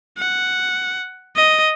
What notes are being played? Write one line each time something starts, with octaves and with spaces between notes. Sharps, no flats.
F#5
D#5